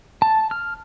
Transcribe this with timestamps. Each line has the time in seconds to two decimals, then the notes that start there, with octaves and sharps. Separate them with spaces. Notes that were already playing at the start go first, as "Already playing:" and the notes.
0.22 A5
0.51 F6